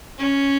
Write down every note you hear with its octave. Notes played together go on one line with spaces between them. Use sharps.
C#4